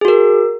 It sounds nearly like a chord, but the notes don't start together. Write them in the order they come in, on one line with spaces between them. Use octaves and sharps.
G#4 F#4 A#4